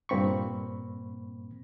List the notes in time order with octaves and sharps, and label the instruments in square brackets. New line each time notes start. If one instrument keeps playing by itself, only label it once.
[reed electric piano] G2 A#2 A#3 C4 B5 C#6